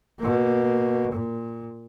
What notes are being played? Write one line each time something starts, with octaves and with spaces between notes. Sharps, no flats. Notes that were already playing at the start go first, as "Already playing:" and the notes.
B2 A#3
A#2